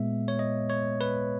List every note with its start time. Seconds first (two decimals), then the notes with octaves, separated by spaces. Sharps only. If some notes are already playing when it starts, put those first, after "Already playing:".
Already playing: A#2 G#3 B3 E5
0.28 C#5
0.39 D#5
0.70 C#5
1.01 B4